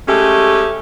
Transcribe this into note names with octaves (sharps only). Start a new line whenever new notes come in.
G#3 A3 C#4 G4